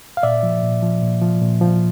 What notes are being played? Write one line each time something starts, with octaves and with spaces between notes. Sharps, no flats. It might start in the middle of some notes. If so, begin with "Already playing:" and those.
F5
A#2 D5 E5
F3
A#2
F3
A#2
F3
A#2
F3